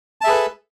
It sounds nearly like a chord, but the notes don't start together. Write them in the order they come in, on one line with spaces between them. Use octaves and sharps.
A5 E5 G#4 B4 A4